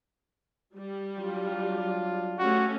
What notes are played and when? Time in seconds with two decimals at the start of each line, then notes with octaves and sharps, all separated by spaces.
0.76 G3
1.18 F#3 D4 F4
2.39 A3 C#4 F#4 G4